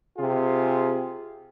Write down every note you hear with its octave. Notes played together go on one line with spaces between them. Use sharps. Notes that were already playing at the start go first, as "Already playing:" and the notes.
C3 F4 G#4